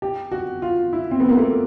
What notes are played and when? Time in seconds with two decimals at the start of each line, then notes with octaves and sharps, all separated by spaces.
0.02 G4
0.32 F#4
0.62 F4
0.93 E4
1.11 C4
1.20 B3
1.29 A#3
1.37 A3